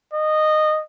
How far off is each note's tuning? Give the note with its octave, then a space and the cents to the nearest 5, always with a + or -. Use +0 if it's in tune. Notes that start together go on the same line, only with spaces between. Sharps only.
D#5 -15